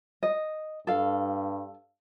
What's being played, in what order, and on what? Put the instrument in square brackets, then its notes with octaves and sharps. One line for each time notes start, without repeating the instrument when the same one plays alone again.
[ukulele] D#5
[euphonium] G2 [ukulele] A4 F5